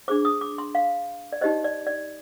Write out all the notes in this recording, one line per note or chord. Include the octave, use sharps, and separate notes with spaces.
D4 G#4 C5 D6
D#6
D6
C6
F5
D5
D#4 G4 C5 D#5
D5
D5